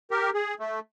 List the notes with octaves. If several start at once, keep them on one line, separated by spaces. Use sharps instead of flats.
G4 A#4
G#4
A3